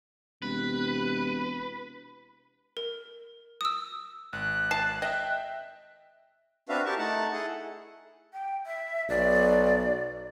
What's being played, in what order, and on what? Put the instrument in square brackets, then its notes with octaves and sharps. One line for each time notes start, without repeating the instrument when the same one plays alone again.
[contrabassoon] E1 [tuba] C3 [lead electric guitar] B4
[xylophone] A#4
D#6 E6
[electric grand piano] G#1 [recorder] F#6
[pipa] A5 [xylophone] C7
[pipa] D#5 [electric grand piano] E5 G5
[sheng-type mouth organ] C4 D4 F#4 B4 E5 F5
E4 G4 A#4 A5 C#6
A3 D#4 F#5 A5
E4 G#4 A4 F#5
[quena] G5
E5
[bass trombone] B1 [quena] D5